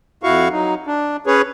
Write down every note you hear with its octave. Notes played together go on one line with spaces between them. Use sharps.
F2 E4 F#4 F5 C#6
F#3 D#4
D4
C#4 G#4 B4 C#5